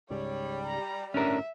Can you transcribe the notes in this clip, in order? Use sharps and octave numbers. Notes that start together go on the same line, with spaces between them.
C#2 G#2 C#3 G3 C#5
A#5
G1 A2 C#4 D4 A#4 E5